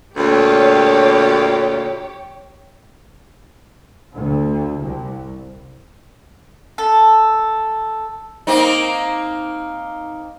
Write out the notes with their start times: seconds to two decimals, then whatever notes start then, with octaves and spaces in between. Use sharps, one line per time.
0.17 D2 A#2 G4 C#5
4.15 D2
4.80 C2
6.78 A4
8.47 A#3 C4 D#4